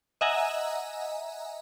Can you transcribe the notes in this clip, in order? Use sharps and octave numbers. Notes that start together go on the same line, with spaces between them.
D#5 E5 F#5 G#5 A#5